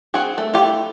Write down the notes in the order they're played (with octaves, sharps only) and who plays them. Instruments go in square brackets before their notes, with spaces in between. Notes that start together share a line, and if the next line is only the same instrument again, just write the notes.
[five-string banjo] C4 F#4 G#4
A3
F4 G4
E4